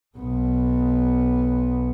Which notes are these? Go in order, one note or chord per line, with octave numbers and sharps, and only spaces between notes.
B1 B3